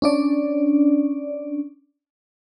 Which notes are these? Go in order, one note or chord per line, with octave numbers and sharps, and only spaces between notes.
C#4 D4 D5